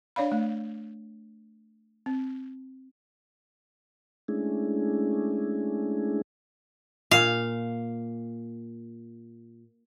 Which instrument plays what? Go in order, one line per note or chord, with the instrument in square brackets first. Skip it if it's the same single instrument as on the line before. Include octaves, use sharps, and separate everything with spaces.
[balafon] D4 C#5 D5 F5 B5
A3
C4
[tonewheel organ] G#3 A3 C#4 D4 E4 G#4
[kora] A#2 [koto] F5